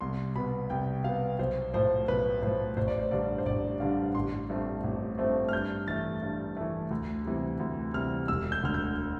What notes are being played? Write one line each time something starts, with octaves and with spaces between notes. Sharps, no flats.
C2 C6
B2 B3 B5
C2 G5
B2 B3 F5
B1 C5
A2 F3 C5
B1 B4
A2 F3 C5
A1 C5
D5
C5
G2 D3 G3 D5
C5
A1 D5
G2 D3 G3 F5
A1 C6
G2 F3 A3 C4
A1
G2 F3 A3 C4
F6
G2 G6
E3 A3 A6
G2
E3 A3
D2
C3 E3 G3
D2
C3 E3 G3 F6
E1 E6
G6
D2 D3 F6
G6